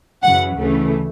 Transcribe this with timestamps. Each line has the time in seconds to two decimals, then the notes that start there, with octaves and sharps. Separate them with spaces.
0.23 F#2 C#3 E3 F#5
0.57 D2 C#3 E3 A3